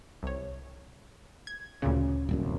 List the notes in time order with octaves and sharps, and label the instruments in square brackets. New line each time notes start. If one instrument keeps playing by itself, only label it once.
[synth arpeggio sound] C2 C#5
G#6
[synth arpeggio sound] D2 A#2 C#3 [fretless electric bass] C#4
[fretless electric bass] D#1 C2 F#2